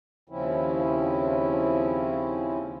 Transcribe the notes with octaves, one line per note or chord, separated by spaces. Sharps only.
D#2 C#3 F3 C4 C#4 E4